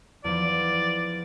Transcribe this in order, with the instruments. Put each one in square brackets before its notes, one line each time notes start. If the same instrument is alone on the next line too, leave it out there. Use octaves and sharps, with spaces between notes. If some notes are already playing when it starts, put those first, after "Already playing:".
[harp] E2 F3 [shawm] D5